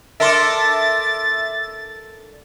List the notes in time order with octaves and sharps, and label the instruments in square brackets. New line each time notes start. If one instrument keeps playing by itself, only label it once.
[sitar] D4 A4 A#4 [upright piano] E5 C6 D6 [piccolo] A6